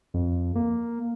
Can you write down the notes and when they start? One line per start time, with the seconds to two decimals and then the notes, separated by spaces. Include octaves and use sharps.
0.14 F2
0.56 A#3